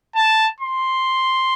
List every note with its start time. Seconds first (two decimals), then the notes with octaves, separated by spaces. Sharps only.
0.16 A5
0.60 C6